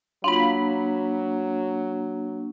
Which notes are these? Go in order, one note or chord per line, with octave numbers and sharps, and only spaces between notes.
F#3 A#3 D4 F4 B5